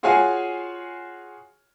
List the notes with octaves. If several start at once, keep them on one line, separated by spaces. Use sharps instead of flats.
F4 F#4 G#4 C#5 F5 G#5